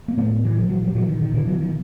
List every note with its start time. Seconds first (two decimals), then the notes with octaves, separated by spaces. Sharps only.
0.08 A#3
0.17 A2 A3 B3
0.45 E3
0.56 A#2 F3
0.69 E3 F#3
0.82 F3 G3
0.95 A#2 E3 F#3
1.08 D#3
1.21 D#3
1.34 B2 D3 E3
1.47 E3 F#3
1.60 D#3 F3